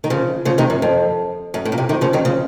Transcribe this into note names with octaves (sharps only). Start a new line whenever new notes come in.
D#3
C#3 F3
C#3 F3
C3 D#3
F#2
F2
F#2
A2
A#2
C3
C3 D#3
C#3 F3
D#3 F#3
C#3 F3